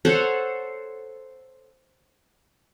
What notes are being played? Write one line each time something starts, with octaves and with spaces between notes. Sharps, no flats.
A4 C5 C#5 F#5